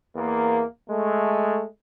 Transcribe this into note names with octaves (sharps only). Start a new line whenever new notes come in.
E2 A#3
G#3 A3